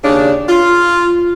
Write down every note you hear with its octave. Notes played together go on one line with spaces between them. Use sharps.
D#2 C#3 D4
F4